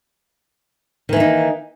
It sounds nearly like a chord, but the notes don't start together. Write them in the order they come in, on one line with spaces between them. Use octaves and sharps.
D#3 E3 A#3 D#4